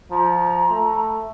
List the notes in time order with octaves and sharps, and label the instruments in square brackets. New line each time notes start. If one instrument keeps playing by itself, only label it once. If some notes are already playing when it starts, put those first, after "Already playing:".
[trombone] F3 [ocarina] A#5
[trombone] A3